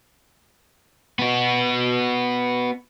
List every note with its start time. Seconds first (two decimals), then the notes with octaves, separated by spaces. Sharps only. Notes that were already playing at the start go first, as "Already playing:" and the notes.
1.19 B3 F#4